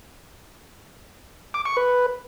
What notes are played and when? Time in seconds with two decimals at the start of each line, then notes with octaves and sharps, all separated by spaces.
1.54 D6
1.66 C#6
1.77 B4